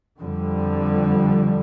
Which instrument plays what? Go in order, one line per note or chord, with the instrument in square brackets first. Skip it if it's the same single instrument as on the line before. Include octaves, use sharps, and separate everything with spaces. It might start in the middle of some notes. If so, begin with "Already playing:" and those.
[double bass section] F2 D3 G3